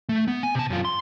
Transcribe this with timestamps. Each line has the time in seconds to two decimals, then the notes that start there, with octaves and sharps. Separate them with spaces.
0.09 A3
0.28 B3
0.43 G#5
0.55 C3 A5
0.70 F#2 F4
0.85 C6